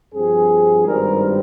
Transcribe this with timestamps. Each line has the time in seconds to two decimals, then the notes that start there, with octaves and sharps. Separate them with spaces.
0.14 G2 F3 C4 G#4
0.84 G#1 G2 G3 C4 A#4